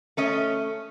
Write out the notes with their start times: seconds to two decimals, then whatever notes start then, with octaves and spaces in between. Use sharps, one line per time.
0.17 A3 C#4 D#5